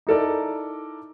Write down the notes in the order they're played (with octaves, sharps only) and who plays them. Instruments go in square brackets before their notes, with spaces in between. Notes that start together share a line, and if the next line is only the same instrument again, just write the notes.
[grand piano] D#4 E4 A4 A#4 D5